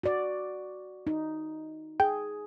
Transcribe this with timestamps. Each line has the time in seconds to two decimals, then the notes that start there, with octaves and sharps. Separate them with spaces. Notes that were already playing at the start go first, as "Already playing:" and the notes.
0.03 F#4 D5
1.07 D#4
2.00 G#4 G5